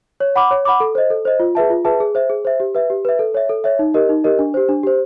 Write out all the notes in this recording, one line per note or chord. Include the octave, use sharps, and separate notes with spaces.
C#5
F#5 B5 D6
C#5
F#5 B5 D6
A4
C5 D#5
A4
C5 D#5
F4
G#4 B4 E5 A5
F4
G#4 B4 E5 A5
G#4
C5 E5
G#4
C5 E5
G4
B4 E5
G4
B4 E5
A4
C#5 E5
A4
C#5 E5
D#4
G4 A#4 D#5
D#4
G4 A#4 D#5
D4
G4 C5
D4
G4 C5